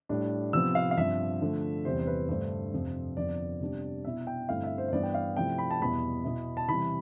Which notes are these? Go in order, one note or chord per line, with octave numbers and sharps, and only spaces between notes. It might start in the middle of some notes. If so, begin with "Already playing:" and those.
A2 G3 D4
C3 F3 B3 E6
F5
F5
G2 F3 C4 E5
D3 F3 A3
E2 C3 E3 G3 C5
C5
B4
G2 D3 A3 D4 C5
F2 C3 F3 C4
F2 D3 F3 B3 D5
C3 G3 B3 D4
B2 B3 E4 E5
G5
G2 D3 A3 C4 E4 F5
E5
C5
C5
G2 E3 B3 D5
G5
F5
C3 F3 A3 C4 E4 G5
B5
A5
E2 B2 G3 B3 E4 B5
B2 B3 E4
A5
C3 E3 G3 B5